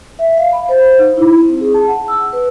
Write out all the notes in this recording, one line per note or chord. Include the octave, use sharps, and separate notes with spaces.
E5
F5
B5
C5
D#4
E4
C4
G#4
A5
F#5
E6
B4